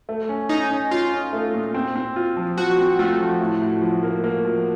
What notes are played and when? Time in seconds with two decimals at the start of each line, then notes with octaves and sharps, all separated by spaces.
0.09 A3
0.29 C#4
0.49 C#4 D#4
0.71 C#4
0.91 C#4 F4
1.12 C#4
1.33 A3
1.54 A#2
1.74 C4
1.96 C4
2.16 F4
2.37 F3
2.58 F3 F#4
2.78 C4
2.99 A3 F4
3.20 F3
3.41 A2
3.62 A2
3.82 F3
4.03 A#3
4.24 A#3
4.45 F3